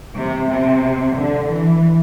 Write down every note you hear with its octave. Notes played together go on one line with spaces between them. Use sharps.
C3
C3
D3
E3